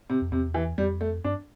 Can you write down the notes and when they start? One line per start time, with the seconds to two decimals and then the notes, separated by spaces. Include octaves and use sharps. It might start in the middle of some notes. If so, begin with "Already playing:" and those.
0.10 C3
0.21 F2
0.32 E2 C3
0.54 E3
0.78 F2 G3
1.01 A3
1.24 G2 D4